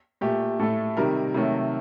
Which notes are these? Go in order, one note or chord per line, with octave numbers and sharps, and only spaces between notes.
A#2 A3 G4
A2 A3 A4
C3 D#3 G3 A#4
C3 D#3 F#3 A3